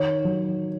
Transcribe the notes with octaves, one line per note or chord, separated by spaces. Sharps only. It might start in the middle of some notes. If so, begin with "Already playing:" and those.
Already playing: D#3 C#5
F#3